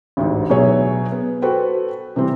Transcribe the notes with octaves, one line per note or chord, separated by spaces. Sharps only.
A1 D2 G#2
B2 F#3 G#4 C#5 E5 G#5
B3
F#4 A4 B4 C5 G5
C3 E3 G3 C4